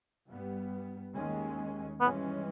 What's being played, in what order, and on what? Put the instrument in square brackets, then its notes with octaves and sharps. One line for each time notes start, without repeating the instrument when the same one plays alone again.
[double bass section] G2 G3 B3
D#2 D#3 G#3 C#4
[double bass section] G2 E3 G#3 C#4 [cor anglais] B3